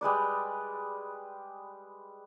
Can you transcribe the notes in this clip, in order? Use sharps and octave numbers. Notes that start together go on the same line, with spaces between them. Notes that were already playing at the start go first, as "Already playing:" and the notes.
G3 G#3 B4 D5